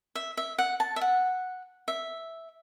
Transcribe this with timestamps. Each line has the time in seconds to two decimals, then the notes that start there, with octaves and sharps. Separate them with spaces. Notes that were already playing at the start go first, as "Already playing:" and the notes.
0.15 E5
0.37 E5
0.58 F#5
0.80 A5
0.96 E5
1.01 F#5
1.88 E5